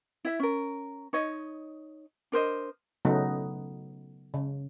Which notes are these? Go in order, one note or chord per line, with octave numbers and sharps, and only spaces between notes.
E4 E5
C#4 A#4
D#4 C#5 D#5
D4 A#4 C5 D#5
C#3 F#3 A3 B3 D#4
C#3